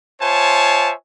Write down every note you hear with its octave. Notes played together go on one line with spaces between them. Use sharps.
F4 C5 C#5 E5 G#5 A5